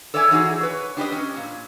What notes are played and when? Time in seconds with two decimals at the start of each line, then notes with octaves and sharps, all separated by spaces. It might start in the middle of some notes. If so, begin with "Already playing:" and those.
0.14 A4 C#5 D5 E5 G#5
0.31 E3 D#4 F#4 G#4
0.61 B4 C#5
0.97 D4 G4 B4 D#5
1.12 C#4
1.36 A#2